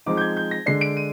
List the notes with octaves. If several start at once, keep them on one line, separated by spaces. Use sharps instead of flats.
F3 G#3 C4 D#4 D6
G6
G#6
G6
A#6
D3 G#3 D4 C7
D7
D#7